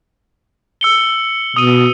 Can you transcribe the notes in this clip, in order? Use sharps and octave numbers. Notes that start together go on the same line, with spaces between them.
E6 C#7 G7
B2 D#6 D#7